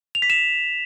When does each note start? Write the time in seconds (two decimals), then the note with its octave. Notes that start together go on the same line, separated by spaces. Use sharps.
0.15 F7
0.22 B6
0.30 E7